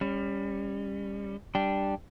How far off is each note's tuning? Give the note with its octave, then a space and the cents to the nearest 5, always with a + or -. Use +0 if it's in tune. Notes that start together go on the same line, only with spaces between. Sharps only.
G3 +25 C#4 +0
G3 -5 D4 +0 G5 +0